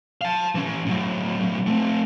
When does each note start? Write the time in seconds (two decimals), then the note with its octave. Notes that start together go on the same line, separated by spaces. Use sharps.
0.21 F5 A5
0.55 E3 C#4
0.86 A2 F#3
1.67 A3 C4